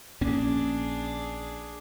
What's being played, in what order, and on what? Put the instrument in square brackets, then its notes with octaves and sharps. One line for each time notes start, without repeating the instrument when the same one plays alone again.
[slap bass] A#1 A#3 C#4 [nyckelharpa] D4 G#4